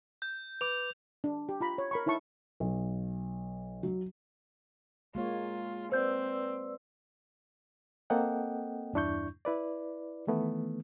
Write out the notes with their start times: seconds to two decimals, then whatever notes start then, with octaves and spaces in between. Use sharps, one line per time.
0.22 G6
0.61 B4 D6 F7
1.24 D4
1.49 G4
1.61 F4 A#5 B5
1.78 C#5
1.91 A#4 B5 C#6
2.06 D#4 E4 C#5 A5 C#6
2.60 B1
3.83 F#3
5.15 G#3 A#3 F4 C#5
5.92 C4 B4 C5 D5 E6 G6
8.10 A#3 C4 A4 D#5 F#5 G5
8.93 E2 G2 D4 E4 C#6 G6
9.45 E4 B4 D5
10.27 D#3 E3 A3 B3